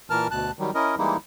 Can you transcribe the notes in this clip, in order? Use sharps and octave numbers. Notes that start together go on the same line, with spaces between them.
A#2 E3 A#4 A5 F6
D2 B2 A5 F#6
D#3 F#3 G3
C#4 E4 A#4 D#5
E3 G3 G#3 A#3 D#4 E4